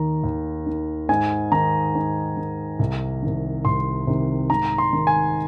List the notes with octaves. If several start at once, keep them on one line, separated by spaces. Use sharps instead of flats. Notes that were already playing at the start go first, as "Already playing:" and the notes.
Already playing: D#2 D#3 A#5
D#2
D#3
G#2 G#5
D#3 A#5
G#2
D#3
C2
C3 D#3
C2 C6
C3 D#3
G#2 A#5
C6
D#3
G#5